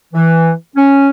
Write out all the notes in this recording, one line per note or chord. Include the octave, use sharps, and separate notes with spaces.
E3
C#4